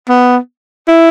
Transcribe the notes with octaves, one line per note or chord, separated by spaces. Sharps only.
B3
E4